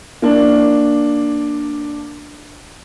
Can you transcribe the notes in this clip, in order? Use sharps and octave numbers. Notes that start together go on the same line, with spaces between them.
A#3 D4